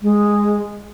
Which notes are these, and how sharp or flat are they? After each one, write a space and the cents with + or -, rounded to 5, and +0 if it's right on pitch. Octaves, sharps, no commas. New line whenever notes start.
G#3 -5